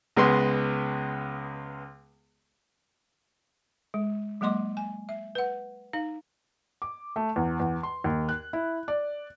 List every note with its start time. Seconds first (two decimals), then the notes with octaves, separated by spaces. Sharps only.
0.16 C#2 C#3 G#3 B3 C6
3.94 G#3
4.41 F#3 G#3 A#3 D#5 C6 D6
4.77 G#5
5.09 E5
5.35 B4 F#5
5.93 D#4 F5
6.82 D6
7.16 A3
7.36 E2
7.60 E2
7.83 C6
8.04 D#2
8.29 F#6
8.53 E4
8.88 D5